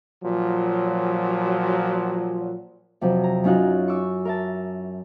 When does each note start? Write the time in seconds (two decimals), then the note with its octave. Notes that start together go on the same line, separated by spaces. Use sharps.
0.23 A#2 F3 F#3
3.01 F2 C3 F3 F#3
3.24 A#5
3.44 F#2 C#4 D#4 F4 F#4 F#6
3.88 C#6 D6 E6
4.25 A#4 E5 A5